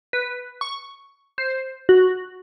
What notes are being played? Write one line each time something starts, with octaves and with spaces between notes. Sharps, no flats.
B4
C#6
C5
F#4